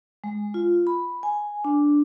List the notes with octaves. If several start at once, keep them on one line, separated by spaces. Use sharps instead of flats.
G#3
F4
B5
G#5
D4